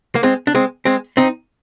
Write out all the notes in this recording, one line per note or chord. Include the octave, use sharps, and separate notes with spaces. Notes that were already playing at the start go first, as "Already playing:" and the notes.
A#3
G#3 C4
D4
G#3 C4
G#3 C4
C4 D#4